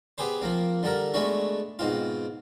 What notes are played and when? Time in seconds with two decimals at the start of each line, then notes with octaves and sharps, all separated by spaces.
0.18 B3 G4 G#4 B4 C5
0.41 F3 A#3 C4
0.83 D3 G3 A4 A#4
1.14 G#3 A3 B3 D4 F#4
1.79 G#2 B2 C4 F4